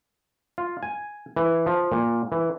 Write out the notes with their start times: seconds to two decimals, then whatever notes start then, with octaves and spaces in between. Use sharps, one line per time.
0.58 F4
0.83 G#5
1.36 E3
1.66 F3
1.92 A#2
2.32 E3